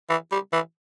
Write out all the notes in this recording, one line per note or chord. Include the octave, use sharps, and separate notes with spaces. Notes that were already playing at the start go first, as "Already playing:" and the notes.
E3
G3
E3